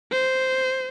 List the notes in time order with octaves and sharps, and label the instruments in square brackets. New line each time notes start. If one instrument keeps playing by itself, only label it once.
[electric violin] C5